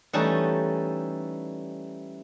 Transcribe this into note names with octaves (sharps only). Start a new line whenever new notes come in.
E3 G3 A3 C#4 D#4